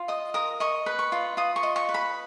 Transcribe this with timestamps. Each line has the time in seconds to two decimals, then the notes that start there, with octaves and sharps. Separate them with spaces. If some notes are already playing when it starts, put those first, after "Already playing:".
Already playing: F4
0.08 D#5 D#6
0.34 A#4 D#6
0.60 D#5 C#6
0.86 B4
0.99 C#6
1.12 F4
1.37 F4 D#6
1.56 C#6
1.63 D#5
1.76 C#6
1.89 B4
1.94 B5